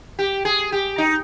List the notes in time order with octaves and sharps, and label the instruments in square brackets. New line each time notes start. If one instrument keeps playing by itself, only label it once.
[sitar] G4
G#4
G4
D#4